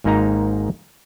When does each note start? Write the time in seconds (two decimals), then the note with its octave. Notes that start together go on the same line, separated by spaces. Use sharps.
0.04 G#1 G#2 A#3 D#4 A#5